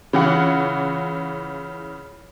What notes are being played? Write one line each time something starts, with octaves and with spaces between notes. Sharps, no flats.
C#3 E3 F4 F#5